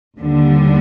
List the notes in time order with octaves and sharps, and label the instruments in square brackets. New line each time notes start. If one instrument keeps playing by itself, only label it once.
[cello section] D#2 D3 G3 D4